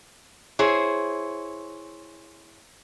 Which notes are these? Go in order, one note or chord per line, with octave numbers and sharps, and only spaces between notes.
E4 G#4 C5 C#5